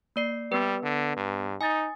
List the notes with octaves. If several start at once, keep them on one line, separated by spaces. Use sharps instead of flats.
A#3 D5 C7
G3 B3 B4
D3
G2
D#4 G#5 D#6 A6